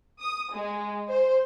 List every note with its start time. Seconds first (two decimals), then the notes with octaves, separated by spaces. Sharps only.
0.20 D#6
0.53 G#3
1.09 C5